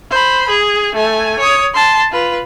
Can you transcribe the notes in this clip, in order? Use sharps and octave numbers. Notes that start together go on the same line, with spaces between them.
C5 B5
G#4
A3 G#5
C#5 D#6
A5 C6
F4 B4